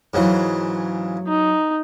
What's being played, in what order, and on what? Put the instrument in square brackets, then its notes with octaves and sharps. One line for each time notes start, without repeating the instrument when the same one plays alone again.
[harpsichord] G#2 C#3 E3 [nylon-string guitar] F#3 G#3
[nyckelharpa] D#4